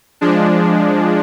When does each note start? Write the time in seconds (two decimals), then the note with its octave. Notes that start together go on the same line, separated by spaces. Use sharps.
0.21 F3 G#3 D4